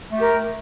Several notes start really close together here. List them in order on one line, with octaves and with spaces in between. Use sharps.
A3 G4 A#4